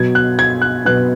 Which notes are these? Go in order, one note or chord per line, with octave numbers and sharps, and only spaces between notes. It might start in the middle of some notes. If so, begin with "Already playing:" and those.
Already playing: B2 F#3 B3 G#6
F#6
G#6
F#6
B2 F#3 B3 F#6